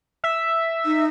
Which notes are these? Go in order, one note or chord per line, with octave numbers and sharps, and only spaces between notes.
E5
D#4